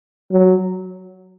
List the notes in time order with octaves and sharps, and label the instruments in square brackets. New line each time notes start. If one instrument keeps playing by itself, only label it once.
[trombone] F#3